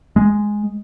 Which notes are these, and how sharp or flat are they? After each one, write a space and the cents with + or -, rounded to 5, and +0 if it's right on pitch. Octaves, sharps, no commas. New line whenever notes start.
G#3 +0